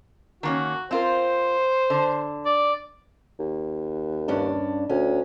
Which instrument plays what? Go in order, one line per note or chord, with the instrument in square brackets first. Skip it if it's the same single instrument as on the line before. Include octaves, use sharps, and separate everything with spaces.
[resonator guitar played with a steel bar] D#3 A#3 C#4 [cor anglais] F#4
[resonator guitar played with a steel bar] C4 F4 A#4 [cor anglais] C5
[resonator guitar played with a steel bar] D3
[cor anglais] D5
[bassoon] D#2
[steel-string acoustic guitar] G2 C#4 D4
[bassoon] D2 [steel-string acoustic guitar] C#4